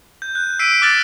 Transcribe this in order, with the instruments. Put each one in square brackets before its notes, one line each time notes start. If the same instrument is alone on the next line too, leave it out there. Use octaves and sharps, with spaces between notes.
[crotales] G6
F#6
E6 B6 C7 D7 D#7
D6 F6 F#6 A6 F#7